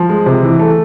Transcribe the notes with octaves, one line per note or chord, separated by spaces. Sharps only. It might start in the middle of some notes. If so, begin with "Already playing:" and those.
Already playing: F3
G#3
C3
E3
A3